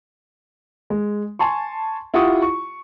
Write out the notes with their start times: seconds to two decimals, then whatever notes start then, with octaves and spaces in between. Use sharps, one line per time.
0.90 G#3
1.39 G#5 A5 C6 C#6
2.14 E4 F4 G4 F#5 C#6 D#6
2.42 C#6